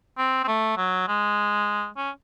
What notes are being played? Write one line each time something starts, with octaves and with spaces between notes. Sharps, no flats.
C4
C4
A3
F#3
G#3
C#4